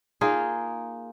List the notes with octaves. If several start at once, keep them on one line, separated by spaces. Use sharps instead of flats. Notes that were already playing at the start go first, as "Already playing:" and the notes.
A#3 D#4 F4 G#4